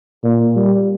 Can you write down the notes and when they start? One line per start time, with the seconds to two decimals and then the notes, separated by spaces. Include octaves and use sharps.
0.23 A#2
0.56 G3